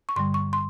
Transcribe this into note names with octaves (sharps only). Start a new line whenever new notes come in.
C#6
G2 D3 G3 C6
C#6
C6